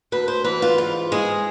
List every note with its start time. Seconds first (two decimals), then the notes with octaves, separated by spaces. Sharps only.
0.12 D2 B4
0.28 C5
0.44 E3 B4
0.62 F4
0.78 G#2 F4
1.12 G#3 G#4